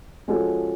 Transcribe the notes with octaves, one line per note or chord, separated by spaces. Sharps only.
F3 G#3 C#4 F#4 A4